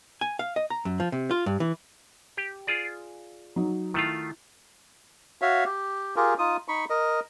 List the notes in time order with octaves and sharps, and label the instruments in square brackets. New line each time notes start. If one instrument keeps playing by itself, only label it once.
[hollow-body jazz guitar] G#5
F5
D#5
A#5
F#2
F3
C3
F4
G2
E3
[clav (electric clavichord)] G4
F4 G#4 D5
[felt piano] F#3 D#4
[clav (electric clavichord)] D#3 A3 F4 [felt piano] E4
[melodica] F#4 C#5 E5 F5
G4
F4 G4 G#4 A#4
D#4 F4 D#6
D#4 B5 C#6
A#4 D#5